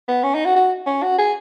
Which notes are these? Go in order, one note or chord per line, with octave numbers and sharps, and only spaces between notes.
B3
C#4
D#4
F#4
F#4
C#4
F#4
G#4